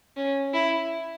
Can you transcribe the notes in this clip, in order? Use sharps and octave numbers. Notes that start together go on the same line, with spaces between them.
C#4
E4